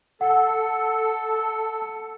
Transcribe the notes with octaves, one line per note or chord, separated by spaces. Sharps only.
A4 F#5